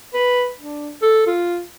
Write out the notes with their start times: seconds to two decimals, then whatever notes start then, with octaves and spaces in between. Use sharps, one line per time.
0.14 B4
0.58 D4
1.02 A4
1.27 F4